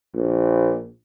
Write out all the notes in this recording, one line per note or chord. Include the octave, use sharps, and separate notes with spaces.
A#1